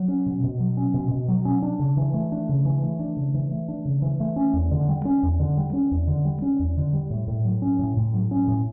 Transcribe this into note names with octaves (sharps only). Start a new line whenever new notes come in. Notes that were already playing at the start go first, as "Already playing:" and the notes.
Already playing: F#3
C#4
B2
B2
F#3
C#4
B2
B2
F#3
C#4
D4
C#3
E3
A3
D4
C#3
E3
A3
D4
C#3
E3
A3
D4
C#3
E3
A3
C#4
E2
D3
G3
C#4
E2
D3
G3
C#4
E2
D3
G3
C#4
E2
D3
G3
A2
A2
F#3
C#4
A2
A2
F#3
C#4
A2